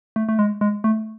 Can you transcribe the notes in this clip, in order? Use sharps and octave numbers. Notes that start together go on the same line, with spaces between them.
A3
A3
G#3
G#3
A3